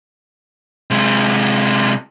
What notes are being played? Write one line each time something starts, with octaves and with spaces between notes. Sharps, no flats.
C3 G#3